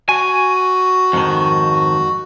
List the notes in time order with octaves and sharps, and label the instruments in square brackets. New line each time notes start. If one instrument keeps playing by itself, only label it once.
[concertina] F#4 [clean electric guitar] G#5
[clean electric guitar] F2 G#2 D#3